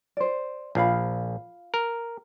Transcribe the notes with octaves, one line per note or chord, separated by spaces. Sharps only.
C5 D5
A#1 F4 F5 B5
A#4